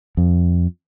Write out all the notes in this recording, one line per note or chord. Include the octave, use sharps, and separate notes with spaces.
F2